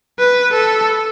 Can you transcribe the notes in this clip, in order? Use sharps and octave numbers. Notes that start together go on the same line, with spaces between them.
B4
A4